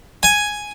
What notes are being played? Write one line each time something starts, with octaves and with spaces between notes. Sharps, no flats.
G#5